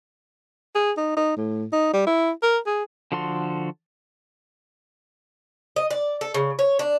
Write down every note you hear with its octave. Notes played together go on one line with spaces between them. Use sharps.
G#4
D#4
D#4
A2
D#4
G3
E4
A#4
G#4
D3 F3 F#4 A4 C6
D#5
D5
A4
C#3
C#5
D4